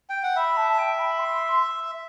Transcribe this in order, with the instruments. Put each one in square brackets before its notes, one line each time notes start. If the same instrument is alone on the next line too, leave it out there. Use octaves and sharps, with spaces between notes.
[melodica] G5
F#5
[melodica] E5 [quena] B5
[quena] A5
G5
B5
C6